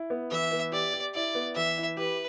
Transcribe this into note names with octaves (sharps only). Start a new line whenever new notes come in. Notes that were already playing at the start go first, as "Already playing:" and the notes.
Already playing: E4
B3
E3 E5
B3
G4 D5
G4
E4 D5
B3
E3 E5
E4
G4 B4